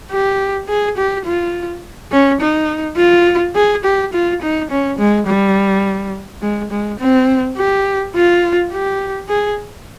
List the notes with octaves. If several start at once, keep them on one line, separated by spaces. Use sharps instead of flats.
G4
G#4
G4
F4
C#4
D#4
F4
G#4
G4
F4
D#4
C#4
G#3
G3
G#3
G#3
C4
G4
F4
G4
G#4